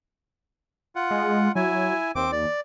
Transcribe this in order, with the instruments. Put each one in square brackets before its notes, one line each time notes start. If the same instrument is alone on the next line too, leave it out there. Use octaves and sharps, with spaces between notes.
[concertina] F4 F#5
[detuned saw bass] G#3
[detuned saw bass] F#3 [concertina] E4 G#5
[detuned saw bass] D#2 [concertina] C4 D6
[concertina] D5